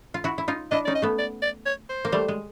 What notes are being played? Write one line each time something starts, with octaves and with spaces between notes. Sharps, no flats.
F4
E4 F#4
E4
D#4 F4
D4 E4 D#5
C#4 D#4 D5
D#5
A3 B3
D5
D5
C#5
C5
A#3
G3 A3
G#3